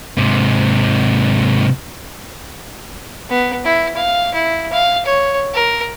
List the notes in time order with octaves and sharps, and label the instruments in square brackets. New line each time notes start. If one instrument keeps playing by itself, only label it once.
[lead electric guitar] G#2 C3
[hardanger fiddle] B3
E4
F5
E4
F5
C#5
A#4